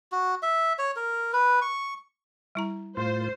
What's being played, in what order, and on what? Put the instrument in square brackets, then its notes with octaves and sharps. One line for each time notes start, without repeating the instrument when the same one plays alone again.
[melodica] F#4
E5
C#5
A#4
B4
C#6
[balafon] G3 E4 A#5
[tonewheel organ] A2 F4 [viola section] C5